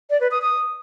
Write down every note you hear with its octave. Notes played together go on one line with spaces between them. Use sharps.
D5
B4
D#6
D#6